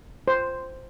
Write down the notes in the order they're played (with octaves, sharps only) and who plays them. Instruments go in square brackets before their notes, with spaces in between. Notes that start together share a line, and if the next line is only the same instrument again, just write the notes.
[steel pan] C5